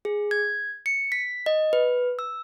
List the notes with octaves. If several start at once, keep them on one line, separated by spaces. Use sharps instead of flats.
G#4
G#6
C#7
B6
D#5
B4
E6